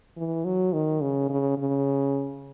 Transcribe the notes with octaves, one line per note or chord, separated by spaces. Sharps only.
E3
F#3
D#3
C#3
C#3
C#3